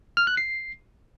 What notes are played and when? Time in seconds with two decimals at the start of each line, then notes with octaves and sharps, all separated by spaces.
0.17 F6
0.27 F#6
0.37 C7